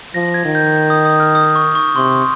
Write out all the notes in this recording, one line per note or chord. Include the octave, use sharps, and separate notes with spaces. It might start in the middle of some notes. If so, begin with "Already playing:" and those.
F3 A#6
G#6
D#3
G6
D#6
D#6
F6
D#6
C#6
C#6
C3 C6